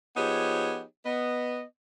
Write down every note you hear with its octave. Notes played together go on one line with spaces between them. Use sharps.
F3 B3 D#4 G4 G#4 C#5
B3 D#5